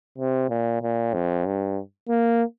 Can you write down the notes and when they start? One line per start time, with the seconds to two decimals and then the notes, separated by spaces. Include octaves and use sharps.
0.18 C3
0.50 A#2
0.82 A#2
1.14 F2
1.46 G2
2.09 A#3